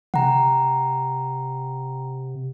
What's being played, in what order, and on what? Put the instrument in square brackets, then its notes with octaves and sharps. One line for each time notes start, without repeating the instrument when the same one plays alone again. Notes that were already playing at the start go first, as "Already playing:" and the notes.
[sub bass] C3 [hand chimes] F#5 G5 A#5